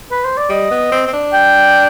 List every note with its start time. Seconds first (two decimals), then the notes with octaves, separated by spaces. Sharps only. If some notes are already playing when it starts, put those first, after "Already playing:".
0.11 B4
0.25 C5
0.37 D5
0.49 G3 D#5
0.71 B3
0.92 C4
1.07 C4
1.13 D4
1.33 G5